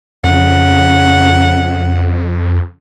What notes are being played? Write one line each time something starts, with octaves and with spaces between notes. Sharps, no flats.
F2 C#3 F#5